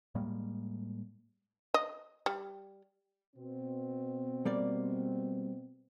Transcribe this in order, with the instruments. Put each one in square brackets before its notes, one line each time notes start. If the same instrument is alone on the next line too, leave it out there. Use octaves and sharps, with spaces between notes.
[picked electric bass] A2 G3 G#3 A#3
[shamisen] D#5
G3
[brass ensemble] B2 C4
[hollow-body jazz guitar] G3 A#3 D5